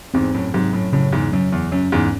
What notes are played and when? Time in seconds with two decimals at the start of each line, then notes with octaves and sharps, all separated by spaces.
0.14 E2 G#2 C4
0.34 F#2 A2
0.54 G#2 C3 F#3
0.73 F#2 A2
0.93 F#2 A2 C#3
1.12 E2 G#2
1.32 F#2 F#3
1.52 E2
1.72 F#2 C#4
1.92 E2 G#2